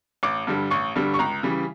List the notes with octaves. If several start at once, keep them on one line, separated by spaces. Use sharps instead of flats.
A1 D6
G2 D3 G3
A1 C#6
G2 D3 G3
C#6
C#2 A#5
C#3 E3 G3